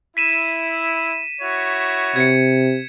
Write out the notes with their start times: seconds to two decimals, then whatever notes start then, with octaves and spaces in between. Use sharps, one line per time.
0.17 E4 B6 D#7 E7
1.41 E4 F#4 C#5
2.16 C3 G#6 C#7